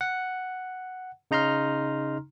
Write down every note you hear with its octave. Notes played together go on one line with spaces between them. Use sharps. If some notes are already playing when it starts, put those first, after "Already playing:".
F#5
C#3 D#4 A#5 C6 F6